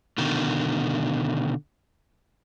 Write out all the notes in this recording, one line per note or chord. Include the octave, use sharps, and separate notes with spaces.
B2 D3 D#3